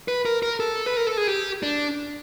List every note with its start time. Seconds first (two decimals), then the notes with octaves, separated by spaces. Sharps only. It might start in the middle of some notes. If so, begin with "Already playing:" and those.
0.08 B4
0.25 A#4
0.43 A#4
0.60 A4
0.86 B4
0.97 A#4
1.07 A4
1.17 G#4
1.27 G4
1.63 D4